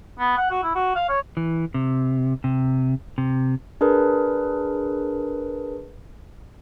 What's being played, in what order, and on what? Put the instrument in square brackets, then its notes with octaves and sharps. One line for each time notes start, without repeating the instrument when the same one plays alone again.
[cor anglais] B3
F#5
F#4
E4
F#4
F5
C#5
[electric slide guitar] E3
C3
C3
C3
[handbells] D4 G#4 A#4 B4